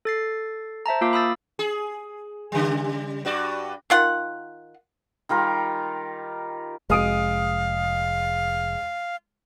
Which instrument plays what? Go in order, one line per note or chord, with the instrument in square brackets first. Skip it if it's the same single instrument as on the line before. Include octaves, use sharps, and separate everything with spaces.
[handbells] A4 A6 C7
C5 E5 A5 A#5
A#3 F4 F5 D6
B5 D#6 E6 A6
[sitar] G#4
C#3 G3
G2 F#4 D5
[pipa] D#3 F4 F#5
[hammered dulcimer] D#3 G3 F4 A#4
[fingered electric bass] F1 [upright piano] G#3 D#6 D7 [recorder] F5